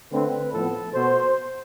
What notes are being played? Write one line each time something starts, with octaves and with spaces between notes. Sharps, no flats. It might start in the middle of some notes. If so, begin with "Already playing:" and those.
D3 A3 C4 B4
A2 F3 B3 A4
B2 B3 C5